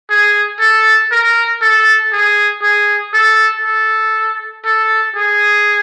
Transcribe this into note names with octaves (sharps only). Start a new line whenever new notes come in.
G#4
A4
A#4
A4
G#4
G#4
A4
A4
A4
G#4